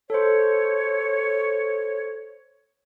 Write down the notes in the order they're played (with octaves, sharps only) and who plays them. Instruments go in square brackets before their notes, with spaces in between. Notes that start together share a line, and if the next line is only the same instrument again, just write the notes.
[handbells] A4 C5 [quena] C#5